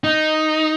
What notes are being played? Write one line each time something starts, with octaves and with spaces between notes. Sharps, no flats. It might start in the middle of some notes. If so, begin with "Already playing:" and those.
D#4